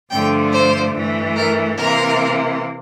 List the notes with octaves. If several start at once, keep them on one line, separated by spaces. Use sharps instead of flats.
G2 D3 F3 A3 G5
C5
G2 E3 A3
A#4
C3 E3 A#3 A#4